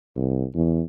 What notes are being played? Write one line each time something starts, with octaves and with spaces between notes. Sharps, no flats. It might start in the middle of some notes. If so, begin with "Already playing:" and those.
C2
E2